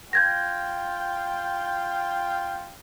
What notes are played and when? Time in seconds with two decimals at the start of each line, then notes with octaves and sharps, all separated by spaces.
0.13 F4 G5 G6 G#6 A#6